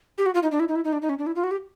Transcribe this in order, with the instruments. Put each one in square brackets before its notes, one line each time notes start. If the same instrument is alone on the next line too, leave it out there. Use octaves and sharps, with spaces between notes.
[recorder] G4
F#4
F4
D#4
D4
E4
D#4
E4
D#4
D4
D#4
C#4
D4
E4
F4
F#4
G4